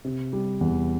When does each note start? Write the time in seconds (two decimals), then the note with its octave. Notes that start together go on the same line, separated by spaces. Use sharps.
0.05 C3
0.33 G3
0.61 E2